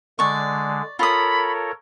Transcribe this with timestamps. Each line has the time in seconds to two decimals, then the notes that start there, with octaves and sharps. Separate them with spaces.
0.19 D3 G#3 D5 C#6
0.99 F4 A4 A#4 C#5 B5 D#6